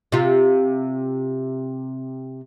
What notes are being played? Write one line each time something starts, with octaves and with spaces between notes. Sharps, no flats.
C3 F4